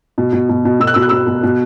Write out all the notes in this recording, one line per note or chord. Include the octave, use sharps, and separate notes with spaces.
B2
B2
B2
B2
B2 E6
F#6
B2 E6
F#6
B2 E6
B2
B2